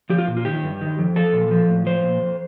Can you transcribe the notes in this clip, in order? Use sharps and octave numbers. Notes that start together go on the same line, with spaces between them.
F3 G4
F4
A#2
F4
D#3 G4
G2
D#3
F2
F3 A4
A#2
F3
A2
F3 C5
A#2
F2